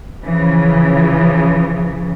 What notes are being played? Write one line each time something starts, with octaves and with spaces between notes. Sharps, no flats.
C#3 E3 F3